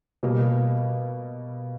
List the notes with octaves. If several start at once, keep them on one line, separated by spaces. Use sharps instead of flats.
B2 G3 A#3